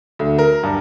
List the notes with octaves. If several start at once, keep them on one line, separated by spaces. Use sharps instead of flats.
D2
A#4
G2